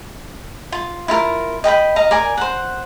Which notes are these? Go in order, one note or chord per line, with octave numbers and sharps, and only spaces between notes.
F4
E4 F4 A#4
D#5 G5 A#5 B5
D#5 F5 A#5
A#4 D5 G#5 A#5
C5 F#5